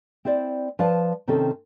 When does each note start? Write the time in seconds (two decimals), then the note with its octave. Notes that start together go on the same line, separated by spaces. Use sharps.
0.25 C4 E4 C5 D5
0.79 F3 B4 D5 F5 A5
1.28 C3 D#3 C4 C#4 D#4 A4